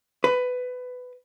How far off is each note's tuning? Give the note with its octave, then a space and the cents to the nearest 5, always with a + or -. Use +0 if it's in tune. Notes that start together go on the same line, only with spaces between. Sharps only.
B4 +15